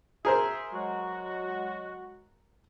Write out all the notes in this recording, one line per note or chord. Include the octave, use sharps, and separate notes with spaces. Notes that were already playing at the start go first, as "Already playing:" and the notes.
G#4 A#4 C5 E5
F#3 G#3 F#4